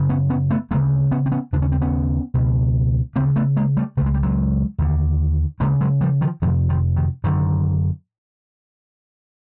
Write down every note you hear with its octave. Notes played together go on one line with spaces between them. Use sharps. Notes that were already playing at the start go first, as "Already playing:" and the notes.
Already playing: F#2 C#3
B3 C#4
B3 C#4
A3 B3
D2 C#3 G#3 A#3
B3 C#4
C4
B3 C#4
D#2 C#3 D4
C#4
C4
B3 C#4
C#2 B2
D2 C#3 A#3 C4
A3 B3
G#3 A#3
G3 A3
C#2 C#3 A3
G#3
G3
F#3 G#3
D#2 D3
D2 C#3 G#3 A#3
F#3 G#3
F3 G3
D#3 F3
F2 C3 D#3 F3
D#3 F3
D#3
F#2 D3 D#3